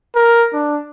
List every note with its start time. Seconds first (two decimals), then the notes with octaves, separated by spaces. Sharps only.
0.15 A#4
0.53 D4